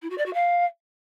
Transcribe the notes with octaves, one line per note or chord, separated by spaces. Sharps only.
E4
F#4
D5
F#4
F5